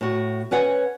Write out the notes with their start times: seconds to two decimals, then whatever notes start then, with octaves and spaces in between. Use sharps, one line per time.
0.01 A2 F#4
0.51 C#4 B4 C#5 F#5